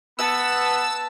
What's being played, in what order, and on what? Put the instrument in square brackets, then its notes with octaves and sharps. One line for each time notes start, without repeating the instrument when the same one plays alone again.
[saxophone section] B3 [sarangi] A5 [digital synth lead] E6